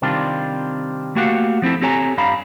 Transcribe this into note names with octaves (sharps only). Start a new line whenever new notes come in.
C3 D#3 G3 C4 D4 F4
A3 A#3 F#4 G4 F5 F#5
F3 C4 E4 A4
C4 G4 A4 C#5 G#5 A#5
G2 G3 F5 A#5 B5